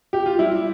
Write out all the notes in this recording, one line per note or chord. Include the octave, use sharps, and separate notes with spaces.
G4
F4
G3 E4